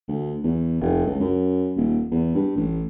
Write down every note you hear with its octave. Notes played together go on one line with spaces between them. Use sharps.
D2
E2
F1
C#2
F#2
D#1
E2
G2
A1